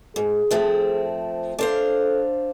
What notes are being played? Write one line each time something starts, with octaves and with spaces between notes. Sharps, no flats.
G#2 G#4
F3 A3 C4
D4 A4 C5 F5